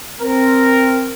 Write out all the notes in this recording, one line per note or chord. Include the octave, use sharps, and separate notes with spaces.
C4 A#4